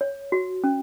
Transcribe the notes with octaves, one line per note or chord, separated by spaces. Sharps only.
C#5
F#4
C#4